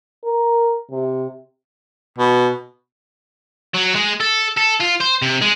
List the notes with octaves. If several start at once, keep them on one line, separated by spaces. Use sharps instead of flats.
A#4
C3
B2
F#3
G#3
A4
A4
F4
C5
C3
G#3